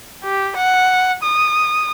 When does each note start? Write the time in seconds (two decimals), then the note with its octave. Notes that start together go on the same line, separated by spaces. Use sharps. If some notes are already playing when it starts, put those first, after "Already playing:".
0.24 G4
0.57 F#5
1.23 D#6